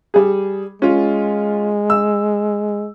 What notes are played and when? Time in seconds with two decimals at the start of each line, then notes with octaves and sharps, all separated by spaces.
0.14 G3 G#4
0.82 G#3 C#4 F4
1.90 E6